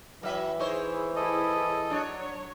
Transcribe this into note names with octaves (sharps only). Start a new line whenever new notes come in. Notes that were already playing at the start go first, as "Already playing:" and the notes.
E3 F#3 E5
D#4 E4 G#4 C5 C#5
E4 G#4 A4 D#5
F#3 D4 C#5